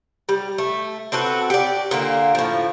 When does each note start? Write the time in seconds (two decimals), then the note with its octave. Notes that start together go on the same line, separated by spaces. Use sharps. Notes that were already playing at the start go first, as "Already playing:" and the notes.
0.29 G3
0.58 A3
1.12 C4 F#4 A4 B4
1.50 G4 D5
1.91 A#2 D3 A#3
2.35 A2 F3